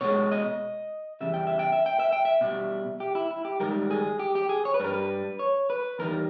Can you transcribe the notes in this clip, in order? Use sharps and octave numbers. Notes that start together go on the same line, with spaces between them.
B2 G#3 C#5
D#5
E2 C#3 G3 E5
G5
E5
G5
E5
G5
E5
G5
E5
B2 G3
G4
E4
E4
G4
G#2 D#3 G3 A#4
G#4
G4
G4
G#4
C#5
B4
G2 G3 A#4
B4
C#5
B4
E2 D#3 G3 A#4